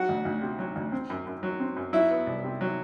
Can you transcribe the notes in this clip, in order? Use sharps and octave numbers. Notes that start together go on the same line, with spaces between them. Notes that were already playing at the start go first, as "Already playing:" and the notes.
Already playing: F#3 F#4 F#5
D2
D2
C3
F#3
D2
C4
F#2
F#2
F#3
C4
F#2
F#3 E4 E5
B3
C2
C3
F#3